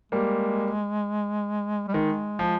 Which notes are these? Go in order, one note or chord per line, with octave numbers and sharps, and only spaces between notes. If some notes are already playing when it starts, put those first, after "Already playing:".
G3 G#3 A#3
G3
D#3 G#3
F3